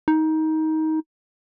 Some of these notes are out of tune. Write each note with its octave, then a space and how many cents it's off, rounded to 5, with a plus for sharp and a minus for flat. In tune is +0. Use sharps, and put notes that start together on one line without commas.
D#4 +20